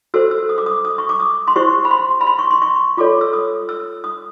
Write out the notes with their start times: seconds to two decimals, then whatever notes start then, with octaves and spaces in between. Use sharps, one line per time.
0.14 F#4 A4 C5 E6
0.31 E6
0.49 D#6
0.58 D6
0.66 D#6
0.85 D#6
0.98 C#6
1.09 D6
1.20 D#6
1.48 C6
1.56 E4 G4 C5 C#6
1.85 B5
1.91 C6
2.21 B5
2.27 C6
2.39 C#6
2.51 C6
2.62 C#6
2.97 F4 A4 C#5 D6
3.21 E6
3.33 D#6
3.69 E6
4.04 D#6